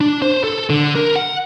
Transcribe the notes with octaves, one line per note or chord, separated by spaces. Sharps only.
D4
C5
A4
D3
A#4
F#5